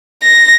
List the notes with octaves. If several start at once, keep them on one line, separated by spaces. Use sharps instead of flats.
A#6